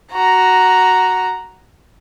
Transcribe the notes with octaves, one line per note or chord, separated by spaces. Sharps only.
F#4 A#5